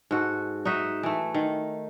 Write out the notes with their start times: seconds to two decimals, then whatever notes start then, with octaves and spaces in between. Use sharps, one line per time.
0.11 G#2 F#4 A4
0.65 D#4 F#4 D#5 E5
1.03 E3 A3
1.34 D#3